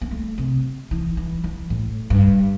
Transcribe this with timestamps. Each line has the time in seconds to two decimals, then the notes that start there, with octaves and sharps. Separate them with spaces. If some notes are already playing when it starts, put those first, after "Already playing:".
0.01 A#3
0.11 A3
0.38 C3
0.91 E3
1.17 E3
1.44 E3
1.70 A2
2.10 G2